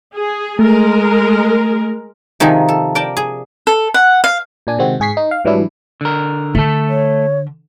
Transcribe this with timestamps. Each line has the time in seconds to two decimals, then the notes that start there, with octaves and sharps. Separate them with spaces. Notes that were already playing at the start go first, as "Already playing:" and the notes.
0.13 G#4
0.59 G#3 A3 A#4
2.40 C3 D#3 F3 D#4 G#4
2.68 A4
2.95 A#4 D5 G5 A5
3.17 G#4
3.67 A4
3.94 F#5
4.24 F5
4.67 A#2 D4 G#5
4.78 C3 D#3 G#3 C4 F#4
5.00 G#2 G#4 C#6 B6 C7
5.17 D#4
5.31 F5
5.45 G#2 E3 F#3 G3 D4 E4
6.01 D3 A#4
6.55 D3 A3 A4
6.88 C#5